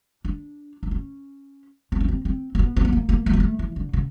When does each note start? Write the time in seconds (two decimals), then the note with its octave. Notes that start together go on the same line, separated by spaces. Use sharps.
0.25 D4
0.83 D4
0.91 C#4
1.92 C4
2.00 C#4
2.08 C4
2.25 C4
2.55 A#3
2.59 B3
2.76 C4
2.85 B3
2.93 A#3
3.09 A#3
3.26 A3
3.33 A#3
3.40 A3
3.59 E3
3.76 D3
3.93 C#3